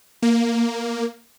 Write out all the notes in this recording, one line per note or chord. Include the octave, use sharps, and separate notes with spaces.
A#3